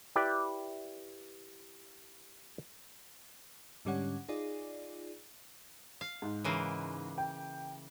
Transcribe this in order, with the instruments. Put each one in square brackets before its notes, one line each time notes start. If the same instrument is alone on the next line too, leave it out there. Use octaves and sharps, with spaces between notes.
[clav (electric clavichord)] E4 G4 B4 D5 G5
[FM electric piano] G#2 D3 G3 C#4 C#5 F#5
D#4 F4 G#4 D5
[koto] F5
[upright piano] G#2
[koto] C#3 E3 A#3
[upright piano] G5